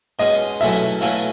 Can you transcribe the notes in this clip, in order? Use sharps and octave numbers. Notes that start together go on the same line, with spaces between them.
B2 G#3 C#4 D#5
B2 F#3 A3 C#4 E4 E5
B2 F#3 A3 C#4 E4 F5